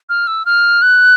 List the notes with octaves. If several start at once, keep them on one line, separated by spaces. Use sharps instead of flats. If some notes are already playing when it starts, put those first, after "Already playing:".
F6
E6
F6
F#6